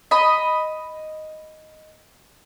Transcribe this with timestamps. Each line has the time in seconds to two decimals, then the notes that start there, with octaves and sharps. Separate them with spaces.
0.11 D#5 B5